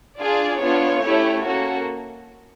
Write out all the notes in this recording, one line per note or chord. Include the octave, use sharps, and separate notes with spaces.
D4 F4 G#4 D5
B3 D4 F4 C#5
A3 C#4 E4 G4
A#3 C#4 F#4 A4